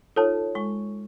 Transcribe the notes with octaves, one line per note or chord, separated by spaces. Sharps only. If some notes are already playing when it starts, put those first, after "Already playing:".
D#4 F4 A4 C#5 A5
G#3 C#6